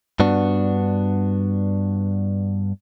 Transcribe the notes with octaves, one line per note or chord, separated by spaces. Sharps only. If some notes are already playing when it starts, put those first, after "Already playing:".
G2 B3 D4 F#4